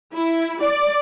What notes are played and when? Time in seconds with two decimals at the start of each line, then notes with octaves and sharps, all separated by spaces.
0.14 E4
0.62 D5